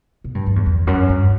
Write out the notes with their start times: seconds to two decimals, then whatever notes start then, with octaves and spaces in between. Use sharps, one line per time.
0.24 B2
0.35 G2
0.46 F#2
0.56 E2
0.66 E2
0.87 F#2
1.09 G2